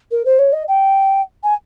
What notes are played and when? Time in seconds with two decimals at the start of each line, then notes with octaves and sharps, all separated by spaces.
0.11 A#4
0.25 C5
0.39 C#5
0.52 D#5
0.68 G5
1.43 G#5